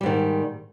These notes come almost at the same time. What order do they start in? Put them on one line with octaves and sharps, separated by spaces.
G3 G#2 D#3